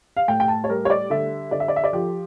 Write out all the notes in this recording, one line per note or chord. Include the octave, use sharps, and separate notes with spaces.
F5
A2 G5
G5
A5
C#5
G3 A#4
C#5
D5
D3 E5
D3 D5
E5
D5
E5
D5
F3 G4